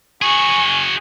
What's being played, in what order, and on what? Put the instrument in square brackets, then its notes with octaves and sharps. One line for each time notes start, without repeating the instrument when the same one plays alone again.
[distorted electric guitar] F#4 G#4 [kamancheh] G#5 C#6